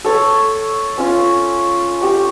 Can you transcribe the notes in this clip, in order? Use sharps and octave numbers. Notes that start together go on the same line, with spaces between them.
A4 C#5
C#4 F4
G4 C#6